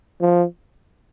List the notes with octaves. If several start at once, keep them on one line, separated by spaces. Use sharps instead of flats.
F3